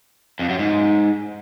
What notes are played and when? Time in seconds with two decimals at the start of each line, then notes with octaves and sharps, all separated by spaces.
0.39 F2
0.49 F#2
0.59 G#2